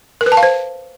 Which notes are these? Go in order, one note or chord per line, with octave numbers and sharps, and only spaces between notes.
A#4
B4
A5
F5
C5